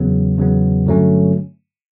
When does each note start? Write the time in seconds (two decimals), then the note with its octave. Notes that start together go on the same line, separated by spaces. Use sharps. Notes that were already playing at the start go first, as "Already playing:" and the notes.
Already playing: E2 C#3 F#3 B3
0.37 E2 C#3 F#3 B3
0.86 G2 D3 F#3 A3 C#4